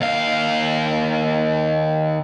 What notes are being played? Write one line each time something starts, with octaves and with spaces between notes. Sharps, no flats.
D#2 F5